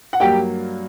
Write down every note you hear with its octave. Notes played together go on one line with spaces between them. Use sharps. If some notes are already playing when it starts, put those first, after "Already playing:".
F#5
G2 F#3 A#3 G4 G5